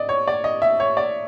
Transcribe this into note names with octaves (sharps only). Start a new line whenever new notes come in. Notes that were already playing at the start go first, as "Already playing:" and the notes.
Already playing: D5 D#5
C#5
D5
D#5
E5
C#5
D5